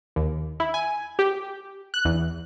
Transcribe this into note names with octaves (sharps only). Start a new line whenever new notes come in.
D#2
E4
G#5
G4
F#6
E2